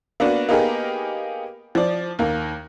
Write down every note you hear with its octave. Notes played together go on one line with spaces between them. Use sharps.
A#3 B3 D4 F#4
A#3 B3 D#4 G4 G#4 A#4
F3 D5
D#2 A#3